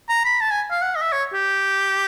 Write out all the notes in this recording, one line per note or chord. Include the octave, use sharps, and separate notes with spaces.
A#5
B5
A5
G#5
F5
F#5
D#5
E5
C#5
G4